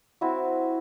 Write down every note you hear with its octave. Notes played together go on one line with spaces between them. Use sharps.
C4 E4 F#4